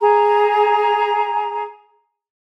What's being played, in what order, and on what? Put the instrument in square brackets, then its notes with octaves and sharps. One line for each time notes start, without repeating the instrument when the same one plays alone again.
[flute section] G#4 A#5